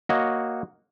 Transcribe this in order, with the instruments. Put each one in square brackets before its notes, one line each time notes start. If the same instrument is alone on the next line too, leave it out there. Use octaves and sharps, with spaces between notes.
[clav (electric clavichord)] A#3 F#4 C#5 D#5